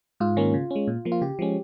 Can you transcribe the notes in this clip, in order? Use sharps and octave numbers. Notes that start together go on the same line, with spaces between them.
G#2 F4
D#3 A#3 C#4
C#3
G#3 C#4
A#2
F3 A#3
F4
C#3 G4
F3 G#3 C#4